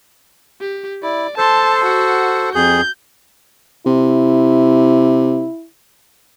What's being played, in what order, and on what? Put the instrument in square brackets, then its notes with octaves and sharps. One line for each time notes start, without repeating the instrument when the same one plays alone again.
[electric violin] G4
[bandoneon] E4 [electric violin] D5
[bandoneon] A4 C5 [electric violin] A5 C6
[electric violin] F#4 F#5
[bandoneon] F2 G#4 [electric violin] G6
[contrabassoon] C3 [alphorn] E4